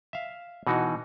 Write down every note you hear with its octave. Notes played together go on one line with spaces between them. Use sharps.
E5 F5
B2 E3 D#4 F#4